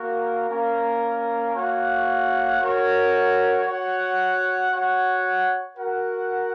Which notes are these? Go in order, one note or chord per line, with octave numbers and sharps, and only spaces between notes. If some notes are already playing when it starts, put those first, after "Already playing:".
Already playing: A#3 F#4 A#4
A#3 C#4 A#4
A#3 F#4 C#5 F#5
F#4 A#4 C#5
F#4 C#5 F#5
F#4 C#5 F#5
F#4 A#4 F#5